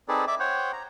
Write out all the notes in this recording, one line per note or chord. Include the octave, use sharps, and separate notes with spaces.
C4 D#4 G#4 A4 B4 D5
D5 E5 D6
C5 C#5 F#5 G5
A#5